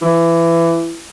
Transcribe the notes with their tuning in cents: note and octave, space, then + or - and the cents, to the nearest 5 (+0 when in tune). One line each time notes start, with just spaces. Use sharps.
E3 +20